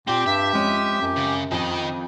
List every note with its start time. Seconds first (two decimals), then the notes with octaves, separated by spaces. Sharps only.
0.07 A#2 C4 G4 G5 C6
0.26 G2 E5
0.53 F2 G#3 C#4
1.01 F#2
1.17 C#3
1.52 F2 D#3 D#5